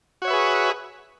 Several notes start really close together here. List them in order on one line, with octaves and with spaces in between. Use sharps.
F#4 C#5 E5 B4 G#4